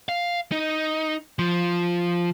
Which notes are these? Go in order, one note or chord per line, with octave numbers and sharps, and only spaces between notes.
F5
D#4
F3